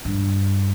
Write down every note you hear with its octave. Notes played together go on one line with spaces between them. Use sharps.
G2